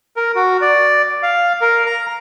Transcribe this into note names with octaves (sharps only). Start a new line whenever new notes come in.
A#4
F#4
D5
F5
A#4
A#5